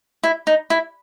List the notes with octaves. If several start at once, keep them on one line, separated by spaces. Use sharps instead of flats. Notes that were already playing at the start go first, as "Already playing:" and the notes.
E4
D#4
E4